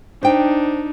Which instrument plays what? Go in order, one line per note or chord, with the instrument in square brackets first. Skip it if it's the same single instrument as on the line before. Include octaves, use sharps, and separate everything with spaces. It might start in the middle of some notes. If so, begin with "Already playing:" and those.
[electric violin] D4 D#4 [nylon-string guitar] C5 G5